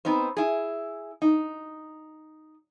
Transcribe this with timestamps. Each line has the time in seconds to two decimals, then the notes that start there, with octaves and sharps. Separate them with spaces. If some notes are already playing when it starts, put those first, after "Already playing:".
0.05 B3 C4 D#4 C5
0.37 E4 G#4
1.22 D#4